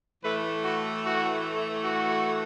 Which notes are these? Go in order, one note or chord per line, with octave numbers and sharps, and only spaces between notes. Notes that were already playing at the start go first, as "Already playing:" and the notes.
A2 E3 A3 B4
F#4
F#4
F#4